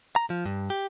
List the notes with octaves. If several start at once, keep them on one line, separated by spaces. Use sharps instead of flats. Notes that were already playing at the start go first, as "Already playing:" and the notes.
A#5
F3
G2
G4